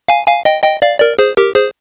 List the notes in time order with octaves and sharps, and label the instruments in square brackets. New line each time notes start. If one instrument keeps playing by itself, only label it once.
[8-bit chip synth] F5 G#5
F5 G#5
D#5 G5
D#5 G5
D5 F5
A#4 D5
G#4 C5
G4 A#4
G#4 C5